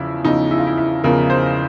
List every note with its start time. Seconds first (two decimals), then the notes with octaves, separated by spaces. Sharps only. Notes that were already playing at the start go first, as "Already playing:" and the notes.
Already playing: E2 C#3 F3 E4
0.25 E2 C#3 F3 D#4
0.51 E4
0.58 F4
0.67 E4
0.77 E4
1.04 E2 C#3 F3 A#4
1.30 C5